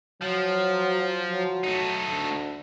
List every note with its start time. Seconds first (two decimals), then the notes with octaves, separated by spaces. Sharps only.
0.21 F3 F#3
1.30 F#3
1.64 A3 D#4
2.10 D2